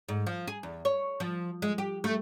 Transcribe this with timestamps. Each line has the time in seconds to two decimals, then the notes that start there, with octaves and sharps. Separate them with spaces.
0.09 G#2
0.27 F3
0.47 G#4
0.63 E2
0.85 C#5
1.20 F3
1.62 G#3
1.78 G4
2.04 A3